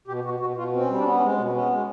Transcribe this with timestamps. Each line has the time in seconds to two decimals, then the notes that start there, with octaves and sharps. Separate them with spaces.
0.08 B2 G4
0.24 B2 F#4
0.40 B2 F#4
0.57 B2 F4
0.73 C4
0.81 C#4
0.89 G3
0.98 D4
1.05 B3 C#4
1.17 C#4
1.21 G#3
1.29 C4
1.37 B2 C#4
1.54 B3 C#4
1.70 G#3